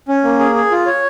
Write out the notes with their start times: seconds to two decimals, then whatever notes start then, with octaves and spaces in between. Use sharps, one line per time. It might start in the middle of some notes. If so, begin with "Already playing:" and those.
0.08 C#4
0.24 A#3
0.39 G#4
0.55 G#4
0.71 F4
0.86 C#5